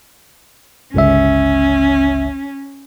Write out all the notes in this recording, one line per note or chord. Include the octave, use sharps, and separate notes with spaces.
G1 C#2 C#4 E5